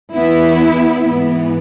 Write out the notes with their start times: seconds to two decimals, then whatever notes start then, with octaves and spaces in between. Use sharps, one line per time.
0.14 E2 E3 B3 E4
1.06 G#2 E3 B3